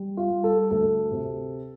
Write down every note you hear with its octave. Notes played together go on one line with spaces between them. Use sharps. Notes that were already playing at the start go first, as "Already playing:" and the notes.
Already playing: G3
F4
G3
A4
D2 A4
C3